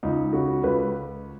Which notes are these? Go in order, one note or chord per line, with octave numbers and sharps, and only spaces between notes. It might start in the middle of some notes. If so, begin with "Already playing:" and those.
C#2 D#4
C#3 F#4
C#2 B4